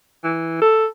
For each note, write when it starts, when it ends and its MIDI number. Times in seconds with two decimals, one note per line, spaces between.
0.24 0.60 52
0.61 0.86 69